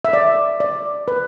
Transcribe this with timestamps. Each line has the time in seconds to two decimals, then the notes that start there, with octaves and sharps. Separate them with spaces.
0.05 E5
0.13 D5
0.60 D5
1.08 B4